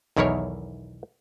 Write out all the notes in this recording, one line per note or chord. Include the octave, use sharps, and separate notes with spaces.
B1 E2 D#3 E4 A#4 C#5